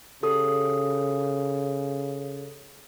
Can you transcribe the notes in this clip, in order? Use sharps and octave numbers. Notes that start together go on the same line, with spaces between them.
C#3 G4 A4 D#6